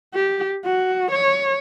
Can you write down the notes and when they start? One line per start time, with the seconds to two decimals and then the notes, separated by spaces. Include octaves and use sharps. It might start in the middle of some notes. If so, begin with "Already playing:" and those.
0.15 G4
0.65 F#4
1.11 C#5